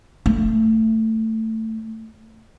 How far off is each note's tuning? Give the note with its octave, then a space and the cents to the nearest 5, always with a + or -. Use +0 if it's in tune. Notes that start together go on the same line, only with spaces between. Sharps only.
A3 +15